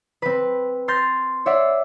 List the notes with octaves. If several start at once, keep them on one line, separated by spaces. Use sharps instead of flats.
C4 B4
C6 F6 G6 A6 A#6
C#5 D5 E5 F#5 C7